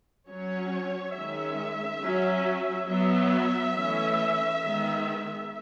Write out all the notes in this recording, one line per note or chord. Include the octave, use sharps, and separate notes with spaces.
F#3 C#4 C#5
D#3 G#3 C#4 E5
F#3 C#4
F#3 B3 E5
E3 A3 C#4
D#3 G#3 B3